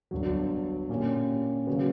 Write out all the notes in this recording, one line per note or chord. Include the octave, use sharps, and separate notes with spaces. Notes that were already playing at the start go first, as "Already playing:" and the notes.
G1 G2 F#3
A#2 A#3 C#4 G4
C#3 F#3 B3